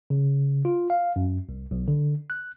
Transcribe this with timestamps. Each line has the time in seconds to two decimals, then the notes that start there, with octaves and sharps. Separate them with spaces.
0.10 C#3
0.65 F4
0.90 F5
1.16 F#2
1.49 C2
1.71 B1
1.88 D3
2.30 F#6